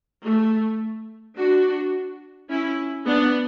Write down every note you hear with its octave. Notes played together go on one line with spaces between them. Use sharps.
A3
D4 F#4
C#4 E4
B3 D4